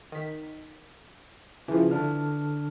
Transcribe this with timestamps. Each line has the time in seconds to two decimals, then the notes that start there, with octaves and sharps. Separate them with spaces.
0.12 D#3 B6
1.68 C#3 E3 F3
1.91 D3 D4 F6